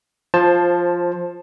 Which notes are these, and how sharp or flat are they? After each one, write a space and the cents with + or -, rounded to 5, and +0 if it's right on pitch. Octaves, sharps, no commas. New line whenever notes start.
F3 +0 C5 +20 A5 +0